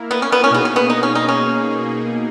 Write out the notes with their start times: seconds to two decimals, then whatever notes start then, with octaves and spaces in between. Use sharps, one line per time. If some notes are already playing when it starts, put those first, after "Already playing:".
Already playing: A#3 E4 A#4
0.11 B3
0.22 C#4
0.32 B3
0.44 C#4
0.50 B2 A#3 B3 D#4 G#4
0.65 C#4
0.76 B3
0.90 D#4
1.03 C#4
1.15 D#4
1.28 C#4